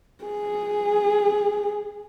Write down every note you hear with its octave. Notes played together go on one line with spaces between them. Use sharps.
G#4